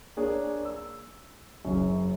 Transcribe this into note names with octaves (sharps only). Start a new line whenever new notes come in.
A#3 D4 G#4 C#5 D5
E6
F#1 F#2